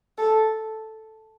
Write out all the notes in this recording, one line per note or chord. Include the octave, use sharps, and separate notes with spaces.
A4